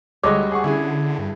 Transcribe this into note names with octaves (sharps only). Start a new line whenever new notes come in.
D2 G3 G#3 F#4 A4 C#5 D#5 D6
G#4 F#5 C#6
D3 C#4 E4 G#4
G2